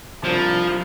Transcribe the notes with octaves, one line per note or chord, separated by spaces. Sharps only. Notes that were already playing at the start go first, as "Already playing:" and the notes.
C2 C3 F3 G3 D4